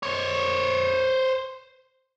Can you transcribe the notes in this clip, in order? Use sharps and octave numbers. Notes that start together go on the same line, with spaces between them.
C5 C#5